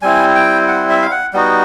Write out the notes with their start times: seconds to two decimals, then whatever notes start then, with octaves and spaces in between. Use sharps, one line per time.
0.02 G3 C4 E4 G#5
0.35 G5
0.68 F#5
0.89 E5
1.02 F5
1.11 F#5
1.33 G3 B3 D#4 F#4